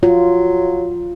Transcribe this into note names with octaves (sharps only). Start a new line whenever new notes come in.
F#3 F4